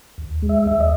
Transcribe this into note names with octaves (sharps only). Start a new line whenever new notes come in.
D#2
G#3
E5
D#2 E5
D#5